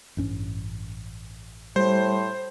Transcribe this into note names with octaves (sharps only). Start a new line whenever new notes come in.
A1 G2 C#4
A2 G3 C5